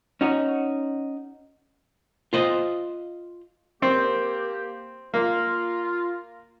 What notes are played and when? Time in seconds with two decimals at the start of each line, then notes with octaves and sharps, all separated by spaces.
0.21 C#4 D#4 F#4
2.33 F4 C5 D#5
3.82 A#3 C4 G4
5.14 A#3 F4